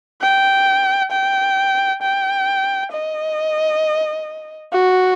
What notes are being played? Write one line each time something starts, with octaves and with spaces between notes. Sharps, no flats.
G5
G5
G5
D#5
F#4